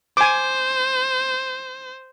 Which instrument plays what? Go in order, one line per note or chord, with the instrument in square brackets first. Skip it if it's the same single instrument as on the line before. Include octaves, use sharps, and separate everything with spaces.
[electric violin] C5 [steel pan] G#5 D6